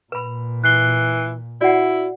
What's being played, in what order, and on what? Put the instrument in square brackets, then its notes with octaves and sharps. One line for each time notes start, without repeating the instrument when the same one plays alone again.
[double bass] A#2 [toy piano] B4 B5
[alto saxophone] E3 [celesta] F#6 C7 G7
[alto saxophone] E4 [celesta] F#4 [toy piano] D5 F#5